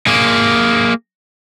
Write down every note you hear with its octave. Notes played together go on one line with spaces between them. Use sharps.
A#3 G#4